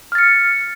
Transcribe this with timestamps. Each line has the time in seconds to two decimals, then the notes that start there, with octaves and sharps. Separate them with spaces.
0.12 F6
0.15 A6
0.18 C#7